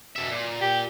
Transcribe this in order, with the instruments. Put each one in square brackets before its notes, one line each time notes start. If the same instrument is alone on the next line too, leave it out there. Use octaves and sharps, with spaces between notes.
[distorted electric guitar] B2 E5
A#2
[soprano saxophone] G4